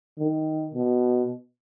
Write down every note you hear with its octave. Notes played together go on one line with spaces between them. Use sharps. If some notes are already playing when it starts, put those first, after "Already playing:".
D#3
B2